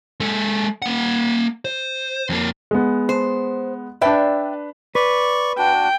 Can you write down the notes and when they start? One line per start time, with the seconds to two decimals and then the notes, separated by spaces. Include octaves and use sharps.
0.20 G#3 A4
0.82 A#3 F#5
1.65 C5
2.30 F2 A#3
2.71 G#3 B3
3.09 C5
4.01 D4 B4 D5 E5 G5
4.95 B4 D5 C#6
5.58 D4 F#4 G5